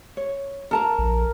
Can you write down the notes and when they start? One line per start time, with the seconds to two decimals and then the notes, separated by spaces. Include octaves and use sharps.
0.17 C#5
0.71 A4 A#4 A5 A#5
0.99 A#1